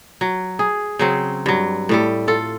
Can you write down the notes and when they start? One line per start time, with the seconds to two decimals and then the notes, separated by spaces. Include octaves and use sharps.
0.21 F#3
0.59 G#4
0.99 C#3 F#3 C4
1.46 G2 F#3
1.89 A2 G3 A4
2.28 F4 A4